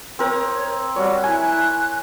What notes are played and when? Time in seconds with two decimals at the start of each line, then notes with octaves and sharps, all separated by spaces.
0.19 C4 A#4 C#5 D#6
0.96 G3 F#4 C#5
1.24 E4 G#5 F#6